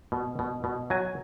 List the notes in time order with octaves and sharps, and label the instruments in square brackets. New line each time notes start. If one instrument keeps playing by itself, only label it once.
[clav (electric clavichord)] B2
B2
B2
F#3 G#5